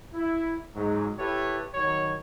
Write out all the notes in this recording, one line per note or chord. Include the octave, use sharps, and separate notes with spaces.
E4
G#2 F#3
E4 G4 A4 B4 C#5
D#3 F#3 C#5